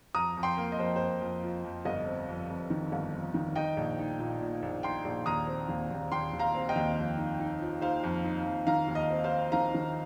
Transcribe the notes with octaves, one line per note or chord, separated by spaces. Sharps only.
F2 A#5 D#6
F2
G5 C6
A#3
D#5
F2 C5
F2 C5
F2
F3
F2
G1 D#5
C4
F2
F2
D#3
G1
F2
D#3
D#4 D#5 G5
A#1
D#4
A#2
A#2
A#1
D#4 G5 C6
A#1
D#2 A#5 D#6
C4
D#2
D#2
D#2 G5 C6
D#2
F5 A#5
C4
D#5 G5
D#2
F2
D#4
D#4
F3
D#4 C5 F5
F2
D#4
F2
D#3 F5 A#5
D#2
D#5
C4
C5 F5
C4
D#3 F5 A#5
D#3